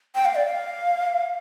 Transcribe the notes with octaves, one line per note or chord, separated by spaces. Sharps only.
G5
F5
D5
F5